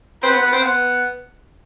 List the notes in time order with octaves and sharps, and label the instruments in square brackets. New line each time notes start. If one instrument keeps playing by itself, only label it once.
[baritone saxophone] C4 [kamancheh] B4
[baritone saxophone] B3
B3
C4
B3